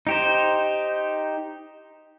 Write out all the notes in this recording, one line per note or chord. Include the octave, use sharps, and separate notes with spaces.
D#4 G4 C5